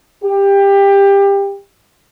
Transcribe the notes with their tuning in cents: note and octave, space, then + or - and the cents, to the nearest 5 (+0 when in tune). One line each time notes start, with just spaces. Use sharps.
G4 +20